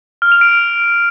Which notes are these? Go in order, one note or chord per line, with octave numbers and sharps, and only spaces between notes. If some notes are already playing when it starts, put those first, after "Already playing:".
F6
F7
D7